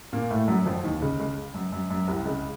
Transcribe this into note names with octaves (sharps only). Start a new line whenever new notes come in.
A#2 A#3
A2 A3
F#2 F#3
F2 F3
D#2 D#3
C#2 C#3
C#2 C#3
F#2
F#2
F#2
C2 C3
C#2 C#3